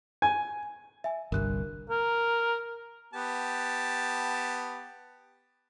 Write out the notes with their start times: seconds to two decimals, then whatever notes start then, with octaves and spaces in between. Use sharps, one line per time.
0.22 G#5
1.04 E5 G#5
1.32 G1 C2 G2 A#4 F#6
1.90 A#4
3.13 B3 G4 A5